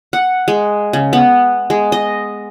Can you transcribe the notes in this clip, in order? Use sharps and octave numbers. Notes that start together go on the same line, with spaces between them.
F#5
G#3
C#3
B3
G#3
D#5